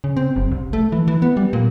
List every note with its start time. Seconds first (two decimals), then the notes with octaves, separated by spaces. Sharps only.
0.04 C#3
0.17 C4
0.36 F#1
0.51 C2
0.73 A3
0.92 E3
1.08 E3
1.22 B3
1.37 G3
1.53 A#2